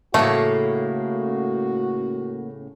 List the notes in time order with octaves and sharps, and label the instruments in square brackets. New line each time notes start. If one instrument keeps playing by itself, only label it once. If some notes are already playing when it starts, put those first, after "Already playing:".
[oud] A2 C#3 [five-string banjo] A3 [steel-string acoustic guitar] A#3 [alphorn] F#4